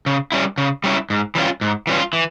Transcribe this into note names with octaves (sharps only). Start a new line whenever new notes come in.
C#3
G3 C#4 E4
C#3
G3 C#4 E4
G#2
E3 G3 C#4 F4
G#2
E3 G3 C#4 F4
E3